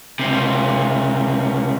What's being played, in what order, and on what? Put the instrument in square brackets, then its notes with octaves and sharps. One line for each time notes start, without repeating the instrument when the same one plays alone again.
[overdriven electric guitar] C#2 C3